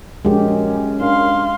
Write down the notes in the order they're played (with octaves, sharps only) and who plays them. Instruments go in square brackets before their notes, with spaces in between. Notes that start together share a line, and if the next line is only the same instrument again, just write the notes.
[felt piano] A#1 [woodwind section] F#2 C#4 [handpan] G#3 G4
[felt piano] D4 [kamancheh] F5 C6